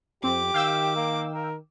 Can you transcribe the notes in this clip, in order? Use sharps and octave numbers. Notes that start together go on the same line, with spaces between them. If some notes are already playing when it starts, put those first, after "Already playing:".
F2 C4 G4 D6
D#3 F5 G5 E6
A#3
A#4